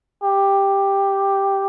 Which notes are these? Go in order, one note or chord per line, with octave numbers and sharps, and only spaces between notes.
G4